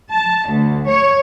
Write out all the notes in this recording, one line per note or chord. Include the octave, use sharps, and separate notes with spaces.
A5
D2
C#5